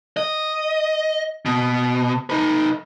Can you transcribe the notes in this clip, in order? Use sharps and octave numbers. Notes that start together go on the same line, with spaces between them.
D#5
B2
D#4 B4